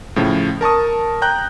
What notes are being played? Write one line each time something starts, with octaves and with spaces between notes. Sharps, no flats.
A2 C#3 F3
A#4 A5 C#6 D#6
G5 A#5 F#6 G6